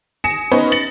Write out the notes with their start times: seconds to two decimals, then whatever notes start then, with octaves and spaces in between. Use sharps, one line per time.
0.24 G#5 D#6 A#6 C#7 E7
0.51 B3 C#4 D#4 B4 C5
0.72 A6 A#6 C#7 F#7